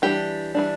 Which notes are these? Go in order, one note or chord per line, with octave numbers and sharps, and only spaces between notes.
E3 G3 D4 G4
E3 G3 D4